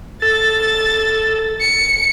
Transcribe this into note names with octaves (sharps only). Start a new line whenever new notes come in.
A4 A6
C#7